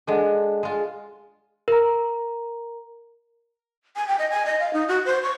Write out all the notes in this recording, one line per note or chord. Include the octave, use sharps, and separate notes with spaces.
G#3 D4 A4 D#5 F#5
G#3 F4
A#4 A#5
G#5
G5
D#5
G#5
D#5
F5
D#4
F#4
C5
C#6